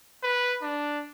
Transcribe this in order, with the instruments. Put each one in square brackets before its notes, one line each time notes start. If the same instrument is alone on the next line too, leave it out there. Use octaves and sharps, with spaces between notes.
[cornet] B4
D4